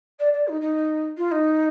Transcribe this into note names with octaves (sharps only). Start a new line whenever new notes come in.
D5
D5
D#4
D#4
F4
D#4